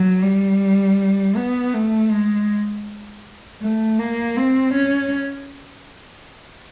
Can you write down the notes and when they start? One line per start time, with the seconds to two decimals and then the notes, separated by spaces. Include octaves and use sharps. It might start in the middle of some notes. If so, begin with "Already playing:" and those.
Already playing: F#3
0.23 G3
1.36 B3
1.74 A3
2.11 G#3
3.62 A3
3.99 A#3
4.37 C4
4.74 C#4